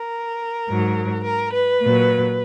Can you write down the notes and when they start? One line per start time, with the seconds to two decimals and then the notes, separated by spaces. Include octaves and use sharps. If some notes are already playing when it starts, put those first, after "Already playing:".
Already playing: A#4
0.69 G#2 F#3
1.24 A#4
1.53 B4
1.81 A#2 F#3